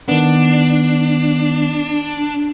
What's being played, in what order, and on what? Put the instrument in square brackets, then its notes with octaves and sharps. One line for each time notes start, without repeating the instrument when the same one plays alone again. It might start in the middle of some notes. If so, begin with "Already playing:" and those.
[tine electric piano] D#3 B3 [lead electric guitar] D4